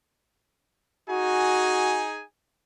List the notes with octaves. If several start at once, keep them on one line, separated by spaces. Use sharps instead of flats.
D#4 F#4 G#4 G#5